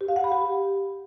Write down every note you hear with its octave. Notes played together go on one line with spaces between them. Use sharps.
G4
F5
F#5
B5
G4